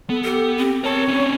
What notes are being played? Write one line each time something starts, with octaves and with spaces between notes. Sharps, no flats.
B3 A4
G4 A4
C4
A#4 C#5 A5
B3 C#4